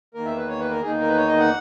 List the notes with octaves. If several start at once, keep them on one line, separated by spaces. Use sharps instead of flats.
E2 D#3 A#3 A#4
E5
B4
C#5
B4
A#4
E2 D#3 A#3 D#4 G#4
A#4
B4
C#5
D#5
F#5